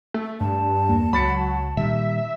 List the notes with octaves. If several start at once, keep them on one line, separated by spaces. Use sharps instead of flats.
A3
G2 A5
E2 A#3
C#2 F#3 B5 A6 C#7
A#2 D#3 G3 E5